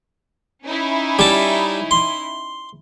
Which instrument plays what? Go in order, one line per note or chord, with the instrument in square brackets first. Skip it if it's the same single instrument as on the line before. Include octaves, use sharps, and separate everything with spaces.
[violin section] C#4 D#4 E4
[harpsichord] G3 A5
C6